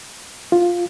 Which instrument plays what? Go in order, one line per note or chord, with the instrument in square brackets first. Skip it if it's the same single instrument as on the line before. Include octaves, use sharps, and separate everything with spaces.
[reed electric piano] F4